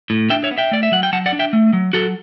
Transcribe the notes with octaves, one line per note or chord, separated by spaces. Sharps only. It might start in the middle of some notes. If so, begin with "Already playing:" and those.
A2
D4 E5 G5
C#5 E5
B3
E5 G5
A3 D5
E5
F#3 F#5
G5
F#3 F#5 A5
D5 F#5
D4
E5 G5
A3
F#3
F#3 F#4 A4